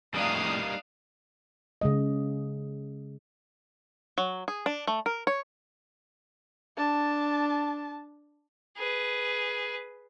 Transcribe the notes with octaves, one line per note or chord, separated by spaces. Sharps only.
F2 A2 G3 A#3 D4 D#4 F5 D#6
C#3 G#3 D#5
F#3
G#4
D4
A3
A#4
C#5
D4 A5
G#4 B4